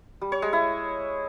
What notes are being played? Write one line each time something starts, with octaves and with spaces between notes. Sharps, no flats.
G3
C#5
G#3
E4